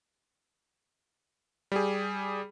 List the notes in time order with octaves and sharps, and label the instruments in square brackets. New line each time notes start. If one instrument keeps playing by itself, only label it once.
[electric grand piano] G3 G4 G#4